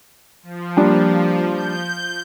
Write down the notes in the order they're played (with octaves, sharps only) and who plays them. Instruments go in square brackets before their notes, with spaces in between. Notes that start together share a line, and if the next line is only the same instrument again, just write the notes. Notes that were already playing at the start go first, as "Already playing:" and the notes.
[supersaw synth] F3
[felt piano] G3 A#3 D4
[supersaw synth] G6